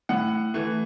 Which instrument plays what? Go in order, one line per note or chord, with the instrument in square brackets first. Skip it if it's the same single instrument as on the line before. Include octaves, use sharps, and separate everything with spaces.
[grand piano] A2 F#5
E3 A3